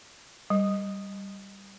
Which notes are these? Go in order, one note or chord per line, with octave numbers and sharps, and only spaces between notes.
G3